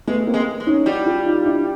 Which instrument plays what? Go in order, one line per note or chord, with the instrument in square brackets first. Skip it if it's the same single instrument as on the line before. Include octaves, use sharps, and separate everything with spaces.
[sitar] G#3 [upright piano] A3 B3
[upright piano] A#3 C4
[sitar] G#3
G#3
[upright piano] C#4 D#4
[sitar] G3 [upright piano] E4 F#4
[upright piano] F4 G4
D#4 F4
D4 E4